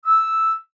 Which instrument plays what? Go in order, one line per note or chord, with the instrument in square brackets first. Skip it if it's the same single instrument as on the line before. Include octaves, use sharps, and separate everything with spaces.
[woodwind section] E6